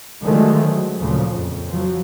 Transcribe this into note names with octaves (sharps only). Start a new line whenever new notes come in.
D3 D#3 F3 F#3 G#3 A3
F#3
D2 A#2 C#3 F3
F2
F3 F#3